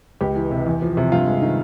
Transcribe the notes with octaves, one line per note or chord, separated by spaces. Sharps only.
C#2 G4
E3
C3
E2
F3
C3
G2 F4
G#3
D#3